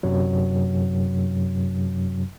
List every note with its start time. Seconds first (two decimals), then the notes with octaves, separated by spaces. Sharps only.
0.03 F#2 C3 F#3